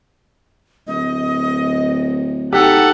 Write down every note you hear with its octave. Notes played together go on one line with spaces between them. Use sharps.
D1 D#5
D#4 G4 A4 F#5